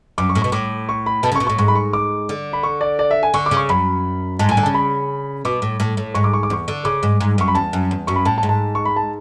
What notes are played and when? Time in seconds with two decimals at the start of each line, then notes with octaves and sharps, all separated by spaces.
0.18 F#2 D6
0.29 C#6
0.35 A2
0.42 B2 C#6
0.52 A2 D6
0.89 C#6
1.06 B5
1.23 B2 A5
1.32 C#3
1.36 C#6
1.40 B2
1.47 A2 C#6
1.59 G#2 C#6
1.68 B5
1.75 C#6
1.93 D6
2.29 D3
2.53 B5
2.63 C#6
2.81 D5
2.99 D5
3.11 E5
3.23 G#5
3.34 D3 C#6
3.46 D6
3.51 C#3
3.57 C#6
3.69 F#2 B5
4.39 G#2 A5
4.49 A2 G#5
4.57 D3
4.63 C#3 A5
4.74 B5
5.45 B2 D6
5.62 A2
5.80 A2
5.97 A2
6.15 G#2 C#6
6.24 D6
6.33 C#6
6.43 D6
6.50 E2 C#6
6.68 D3
6.85 C#3 D6
7.03 G#2
7.20 G#2
7.38 F#2 C#6
7.48 B5
7.55 E2 A5
7.73 F#2
7.91 E2
8.07 F#2 C#6
8.16 B5
8.25 A2 A5
8.38 A5
8.43 G#2
8.49 A5
8.75 C#6
8.85 B5
8.96 A5